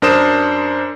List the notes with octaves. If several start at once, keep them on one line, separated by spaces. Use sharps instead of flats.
F#2 D4 A#4 C5 D#6 E7